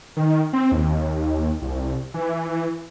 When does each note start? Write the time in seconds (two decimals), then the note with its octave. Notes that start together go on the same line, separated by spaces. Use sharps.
0.17 D#3
0.53 C4
0.72 D#2
1.62 C2
2.14 E3